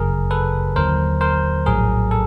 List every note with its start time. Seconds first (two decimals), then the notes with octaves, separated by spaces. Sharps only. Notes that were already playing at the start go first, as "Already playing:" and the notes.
Already playing: G1 F#2 C#3 G#4 A#4
0.31 A4 B4
0.76 D#2 D3 F#3 A#4 C5
1.21 A#4 C5
1.66 A#1 A2 F#3 G#4 A#4
2.11 A4